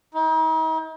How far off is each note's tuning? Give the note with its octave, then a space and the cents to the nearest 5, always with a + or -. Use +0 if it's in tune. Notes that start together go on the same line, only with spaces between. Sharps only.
D#4 +40